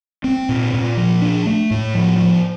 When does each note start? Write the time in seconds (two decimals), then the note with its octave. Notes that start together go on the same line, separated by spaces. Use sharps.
0.24 C4
0.49 A#2
0.74 A#2
0.97 F3
1.22 D4
1.46 A3
1.71 A2
1.94 F3
2.18 F3